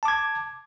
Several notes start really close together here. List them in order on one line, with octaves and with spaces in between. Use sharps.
A5 D6 G#6